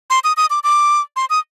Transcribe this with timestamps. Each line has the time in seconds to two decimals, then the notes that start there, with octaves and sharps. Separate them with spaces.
0.10 C6
0.24 D#6
0.37 D#6
0.50 D6
0.64 D6
1.16 C6
1.30 D#6